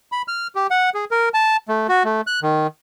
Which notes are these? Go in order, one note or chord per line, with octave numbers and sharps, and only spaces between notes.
B5
F6
G4
F#5
G#4
A#4
A5
A3
F#4
A3
F#6
D#3